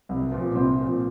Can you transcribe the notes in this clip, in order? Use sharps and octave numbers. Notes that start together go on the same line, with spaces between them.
C2
A#2 F3
C2 C4
A#2 F3